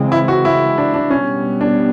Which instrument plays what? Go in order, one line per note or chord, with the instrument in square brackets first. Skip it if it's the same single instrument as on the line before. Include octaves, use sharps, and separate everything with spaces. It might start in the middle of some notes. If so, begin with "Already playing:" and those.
Already playing: [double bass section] C#3 E3 G#3 C4
[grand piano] E4
F#4
E4
D4
D4
[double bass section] B2 G3 B3 [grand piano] C#4
[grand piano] D4